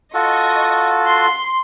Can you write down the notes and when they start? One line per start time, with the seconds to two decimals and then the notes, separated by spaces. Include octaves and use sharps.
0.14 F4 F#4 A4 D#5 C#6
1.08 C6